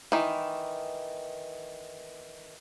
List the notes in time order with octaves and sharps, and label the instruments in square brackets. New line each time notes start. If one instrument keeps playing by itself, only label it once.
[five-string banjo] D#3 E3